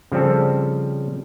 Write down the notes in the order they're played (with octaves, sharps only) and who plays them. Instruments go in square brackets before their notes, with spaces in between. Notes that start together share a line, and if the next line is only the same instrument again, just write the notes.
[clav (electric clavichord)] C#3 F3 G3 C4 A4